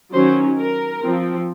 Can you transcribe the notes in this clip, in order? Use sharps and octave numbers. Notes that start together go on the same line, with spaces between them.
D#3 F#3 C#4 C5
A#4
F3 C4